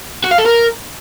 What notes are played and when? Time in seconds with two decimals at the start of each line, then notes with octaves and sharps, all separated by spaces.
0.24 F#4
0.31 F5
0.39 A4
0.46 A#4